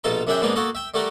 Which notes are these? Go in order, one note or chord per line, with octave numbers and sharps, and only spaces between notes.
A#1 B2 F4 A4 A#5
F#2 F#3 D4 G#4 E5 G5
G#2 C#3 A#3 B3 D4 D#4
A#3 F#4 A4 D#5
E5 G5
G3 A3 F#4 G4 A#4